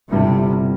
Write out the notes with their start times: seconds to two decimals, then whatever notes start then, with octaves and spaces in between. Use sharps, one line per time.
0.10 G1 G2 C3 G3 C4 E4